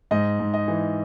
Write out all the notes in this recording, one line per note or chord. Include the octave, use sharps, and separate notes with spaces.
G#2 D#5
G#2
D#5
E3